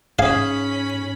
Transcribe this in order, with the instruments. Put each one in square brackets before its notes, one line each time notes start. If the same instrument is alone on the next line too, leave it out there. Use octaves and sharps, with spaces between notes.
[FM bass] G#2 [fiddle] C#4 B5 [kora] G#4 [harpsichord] F5